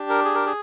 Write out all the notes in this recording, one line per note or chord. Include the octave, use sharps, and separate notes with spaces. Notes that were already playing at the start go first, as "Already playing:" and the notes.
Already playing: D4 G4
A#4
G#4
A#4
G#4